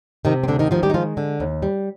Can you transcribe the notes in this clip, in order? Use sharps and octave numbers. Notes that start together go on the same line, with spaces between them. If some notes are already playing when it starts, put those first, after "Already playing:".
C3 D#3 D#4
C4
D2 D3 D4
D#3 D#4
D#3 F3 F4
G3 G4
D#4
F3 G#3 F4
D3
D#2
G3